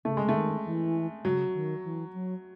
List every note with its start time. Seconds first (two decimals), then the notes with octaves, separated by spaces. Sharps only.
0.05 C#3 A3
0.17 G#3
0.26 C#3 A3
0.35 D#3
0.65 E3
1.24 C#3 F#3
1.54 D#3
1.84 E3
2.14 F#3